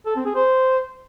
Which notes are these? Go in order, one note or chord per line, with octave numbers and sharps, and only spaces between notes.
A4
C4
G#4
C5